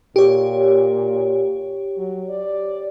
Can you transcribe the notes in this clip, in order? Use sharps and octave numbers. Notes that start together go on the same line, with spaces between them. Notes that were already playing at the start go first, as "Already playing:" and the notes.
A#2 G4 C#5
F#3
D5